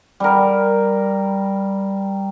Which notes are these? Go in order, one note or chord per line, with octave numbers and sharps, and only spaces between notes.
G3 A#4